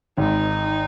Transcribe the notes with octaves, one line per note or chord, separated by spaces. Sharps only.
G#1 G#2 D#4